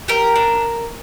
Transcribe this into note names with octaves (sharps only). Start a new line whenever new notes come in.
G4 A#4
D4